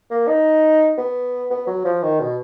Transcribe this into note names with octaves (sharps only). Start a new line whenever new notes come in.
A#3
D#4
B3
B3
F#3
F3
D#3
B2